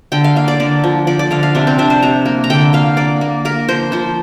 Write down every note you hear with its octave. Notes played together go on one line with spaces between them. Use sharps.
D3 G5
F5
A#3 F5
D5
D3 D5
F3
F3 D5
D5
D3 F5
F5
C3 D4
C4
C3 D4
C5
C3 A#5
A#3
A#5
D3 G5
A#3 F5
A#3 D5
A#3
A#3 A#4
F3 C5
F3 C5